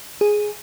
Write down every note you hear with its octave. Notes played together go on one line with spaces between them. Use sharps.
G#4